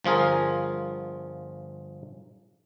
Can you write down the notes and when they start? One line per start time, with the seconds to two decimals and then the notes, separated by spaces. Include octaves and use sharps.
0.04 G1 F3 F4 G#4 A#4